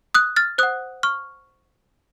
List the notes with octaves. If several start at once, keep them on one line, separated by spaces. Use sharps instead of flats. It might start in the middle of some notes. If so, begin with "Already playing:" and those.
D#6 F#6
F6 A6
C5 F#5 D#6 F#6
C#6 F6